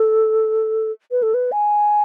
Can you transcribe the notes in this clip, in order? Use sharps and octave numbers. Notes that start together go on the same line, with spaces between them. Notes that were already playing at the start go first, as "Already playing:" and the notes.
Already playing: A4
B4
A4
B4
G#5